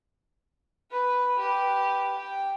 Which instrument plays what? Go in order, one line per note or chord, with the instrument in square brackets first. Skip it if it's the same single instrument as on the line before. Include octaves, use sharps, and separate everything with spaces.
[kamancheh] B4 B5
G4 B4
G5